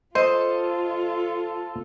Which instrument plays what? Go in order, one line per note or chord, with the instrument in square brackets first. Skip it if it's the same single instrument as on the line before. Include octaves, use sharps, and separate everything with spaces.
[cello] F4 [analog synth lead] A4 [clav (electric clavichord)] C5 [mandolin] D#5